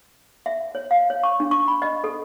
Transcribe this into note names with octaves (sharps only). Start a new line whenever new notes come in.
E5
C#5
F5
C#5
C#6
D4
C#6
B5
D#5
A4